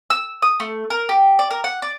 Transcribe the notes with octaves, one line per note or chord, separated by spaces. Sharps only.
E6
D#6
A3
A#4
G4
D5
A#4
F#5
D5